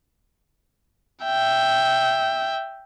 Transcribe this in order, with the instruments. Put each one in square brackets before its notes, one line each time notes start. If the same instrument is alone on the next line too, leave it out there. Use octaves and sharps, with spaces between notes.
[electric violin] E5 G5